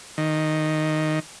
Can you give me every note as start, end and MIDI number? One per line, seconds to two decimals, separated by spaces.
0.18 1.20 51